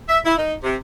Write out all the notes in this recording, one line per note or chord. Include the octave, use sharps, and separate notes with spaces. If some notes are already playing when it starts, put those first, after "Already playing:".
E5
E4
D#4
C3